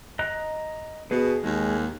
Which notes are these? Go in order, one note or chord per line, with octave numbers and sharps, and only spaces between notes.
D#5 A#5 F#6
B2 G#4 B4
D#2 G#3